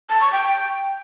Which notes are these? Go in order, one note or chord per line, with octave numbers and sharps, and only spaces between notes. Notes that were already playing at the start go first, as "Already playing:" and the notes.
A5
C#6
G5